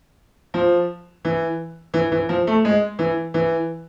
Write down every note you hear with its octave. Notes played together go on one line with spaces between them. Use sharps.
F3
E3
E3
E3
F3
A3
G#3
E3
E3